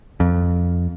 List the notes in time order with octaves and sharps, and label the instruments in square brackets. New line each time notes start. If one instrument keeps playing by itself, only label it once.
[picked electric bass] F2